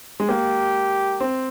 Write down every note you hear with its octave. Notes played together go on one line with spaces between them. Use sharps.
G#3
A#3 G4
C4